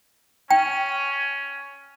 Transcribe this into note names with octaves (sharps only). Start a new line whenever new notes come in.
C#4 G5